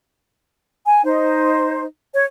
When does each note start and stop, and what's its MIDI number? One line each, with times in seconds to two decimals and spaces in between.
0.85 1.03 80
1.04 1.84 63
1.04 1.84 72
2.13 2.25 73